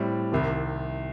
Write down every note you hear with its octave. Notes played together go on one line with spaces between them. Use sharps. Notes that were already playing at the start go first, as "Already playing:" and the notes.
Already playing: A2 G3 C4
C2 C3 D#3